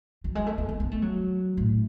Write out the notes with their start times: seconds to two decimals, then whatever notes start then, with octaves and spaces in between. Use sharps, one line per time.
0.24 F#3
0.35 G#3
0.47 A3
0.58 B3
0.69 B3
0.80 B3
0.91 A3
1.02 F#3
1.57 A2